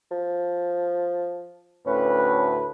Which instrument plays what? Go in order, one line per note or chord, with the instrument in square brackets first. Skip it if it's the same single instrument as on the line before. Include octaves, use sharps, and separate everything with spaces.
[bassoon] F3
[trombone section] D2 A2 B4 [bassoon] C#4